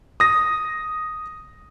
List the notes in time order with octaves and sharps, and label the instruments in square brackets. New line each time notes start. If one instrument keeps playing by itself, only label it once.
[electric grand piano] D#6 A#6